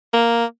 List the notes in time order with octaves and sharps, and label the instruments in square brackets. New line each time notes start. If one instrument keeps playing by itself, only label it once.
[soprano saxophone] A#3